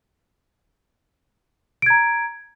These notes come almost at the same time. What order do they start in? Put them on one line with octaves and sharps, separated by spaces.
D7 G#6 A#5